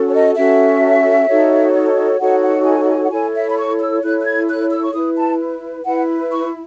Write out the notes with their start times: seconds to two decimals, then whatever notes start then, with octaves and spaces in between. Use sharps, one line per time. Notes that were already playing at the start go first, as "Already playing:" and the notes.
Already playing: C#4 F#4 A4
0.08 C#5
0.13 D#5
0.36 C#4 F#4 A4 E5
1.27 D#4 F#4 A4 C#5
2.19 D#4 F#4 A4 C#5 F#5
2.42 F#5
2.65 G#5
2.82 F#5
2.88 G#5
3.03 F#5
3.10 E4 A4 C#5 G#5
3.34 E5
3.49 B5
3.56 C#6
3.80 E6
4.02 E4 A4 C#5 F#6
4.19 F#6
4.25 G#6
4.48 F#6
4.71 E6
4.83 C#6
4.93 E4 B4 D#6
5.17 A5
5.85 E4 B4 F#5
6.31 C#6